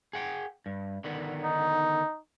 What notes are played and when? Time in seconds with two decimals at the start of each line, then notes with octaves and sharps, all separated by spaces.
0.13 G#4 F#5 G5
0.66 G2
1.04 D3 D#3 B3
1.44 D#4